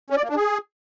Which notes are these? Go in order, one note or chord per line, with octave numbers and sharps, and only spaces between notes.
C#4
D5
A#3
D4
G#4